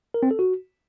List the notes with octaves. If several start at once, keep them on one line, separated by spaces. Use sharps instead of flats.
A#4
C4
A4
F#4